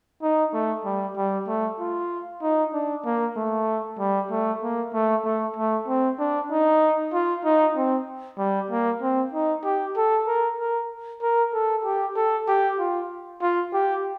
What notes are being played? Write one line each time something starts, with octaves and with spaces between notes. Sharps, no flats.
D#4
A3
G3
G3
A3
F4
D#4
D4
A#3
A3
G3
A3
A#3
A3
A3
A3
C4
D4
D#4
F4
D#4
C4
G3
A#3
C4
D#4
G4
A4
A#4
A#4
A#4
A4
G4
A4
G4
F4
F4
G4